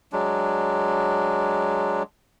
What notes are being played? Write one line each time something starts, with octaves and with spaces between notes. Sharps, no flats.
F#3 G#3 D4